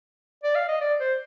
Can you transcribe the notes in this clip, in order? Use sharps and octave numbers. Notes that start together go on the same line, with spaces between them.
D5
F5
D#5
D5
C5